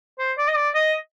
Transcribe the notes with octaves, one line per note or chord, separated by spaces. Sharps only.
C5
D5
D#5
D5
D#5